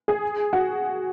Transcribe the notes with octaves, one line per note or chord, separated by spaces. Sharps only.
G#4
F#4